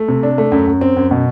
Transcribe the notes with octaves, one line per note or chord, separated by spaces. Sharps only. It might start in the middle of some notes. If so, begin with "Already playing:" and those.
Already playing: A3
C3
D4
A3
F#2
F#2
C4
F#2
B2